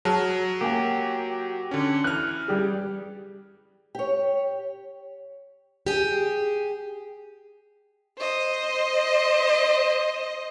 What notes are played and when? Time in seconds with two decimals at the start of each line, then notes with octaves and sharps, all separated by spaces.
0.05 F#3 G#4 A5 F6
0.61 A#3 G4 G#5
1.71 D3 C#4
2.04 E3 F6 F#6
2.48 G3 G4 G#4
3.95 G4 C#5
5.86 G4 G#4
8.19 C5 D#5